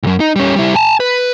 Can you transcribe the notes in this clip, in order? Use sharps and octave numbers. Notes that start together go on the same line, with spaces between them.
C2 F#2
D#4
G3 C#4
G3 E4
G#5 A5
B4